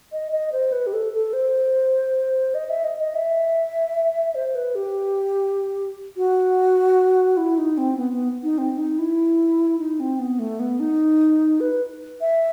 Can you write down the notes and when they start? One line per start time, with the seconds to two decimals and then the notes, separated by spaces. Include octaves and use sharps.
0.13 D#5
0.32 D#5
0.52 C5
0.72 B4
0.87 G4
0.93 A4
1.13 A4
1.33 C5
2.54 D#5
2.69 E5
2.84 D#5
3.00 D#5
3.15 E5
4.35 C5
4.55 B4
4.75 G4
6.17 F#4
7.37 E4
7.58 D#4
7.78 C4
7.97 B3
8.13 B3
8.43 D#4
8.58 C4
8.78 D#4
8.99 E4
9.79 D#4
10.00 C4
10.19 B3
10.39 A3
10.60 B3
10.80 D#4
11.60 B4
12.21 E5